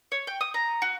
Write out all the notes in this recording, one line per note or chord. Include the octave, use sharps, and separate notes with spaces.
C#5
G5
D#6
A#5
F#4